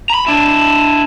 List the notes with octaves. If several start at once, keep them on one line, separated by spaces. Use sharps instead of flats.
A#5 B5
D4 E4